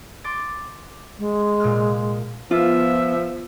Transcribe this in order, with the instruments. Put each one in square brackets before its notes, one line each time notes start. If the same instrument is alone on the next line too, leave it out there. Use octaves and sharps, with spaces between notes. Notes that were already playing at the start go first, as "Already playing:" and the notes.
[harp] C6 D6 A6
[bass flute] G#3
[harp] A#2 F6
[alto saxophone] F3 [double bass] B3 [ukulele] F4 [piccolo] E5